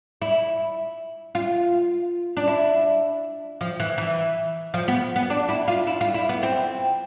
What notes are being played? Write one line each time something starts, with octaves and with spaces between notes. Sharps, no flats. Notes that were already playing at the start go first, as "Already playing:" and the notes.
E4
F4
D4
E4
F3
E3
E3
F3
B3
B3
D4
E4
F4
E4
F4
E4
B3
C4